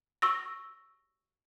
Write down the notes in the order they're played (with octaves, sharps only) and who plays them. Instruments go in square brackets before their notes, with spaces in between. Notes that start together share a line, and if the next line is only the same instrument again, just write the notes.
[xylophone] C#6 E6 A#6